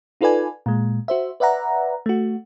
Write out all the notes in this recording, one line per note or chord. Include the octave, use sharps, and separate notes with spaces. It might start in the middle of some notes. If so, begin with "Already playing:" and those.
D#4 F4 A4 B4 D5 G#5
A#2 G#3
F#4 C5 E5
B4 D5 E5 F#5 A#5
A3 F#4